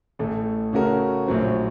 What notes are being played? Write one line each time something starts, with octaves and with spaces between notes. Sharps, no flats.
A1 A2 A3
C#3 A3 C#4 F#4 A#4
A#1 A2 F#3 C4